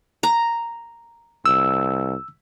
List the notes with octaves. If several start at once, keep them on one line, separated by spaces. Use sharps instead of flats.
A#5
C2 E6